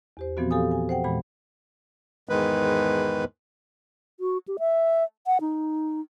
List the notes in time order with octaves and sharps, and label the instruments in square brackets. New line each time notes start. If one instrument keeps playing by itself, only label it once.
[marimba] E2 G4 C5
A#2 E3 F3 B3 C4 F#4
G4 A4 F5 G#5 D#6
G#5
C5 F#5 G5
E2 A#2 E3 G#3 B5
[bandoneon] E2 G#2 D#3 G#3 B4
[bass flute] F#4
G4
E5
F#5
D#4